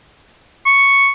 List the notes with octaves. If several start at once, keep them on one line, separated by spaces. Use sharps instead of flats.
C#6